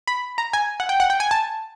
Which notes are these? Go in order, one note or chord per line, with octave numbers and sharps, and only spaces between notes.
B5
A#5
G#5
F#5
G5
F#5
G5
G#5
A5